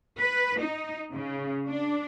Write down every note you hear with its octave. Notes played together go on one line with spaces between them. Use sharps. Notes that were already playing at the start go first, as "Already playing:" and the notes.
B4
D#4
C#3
D4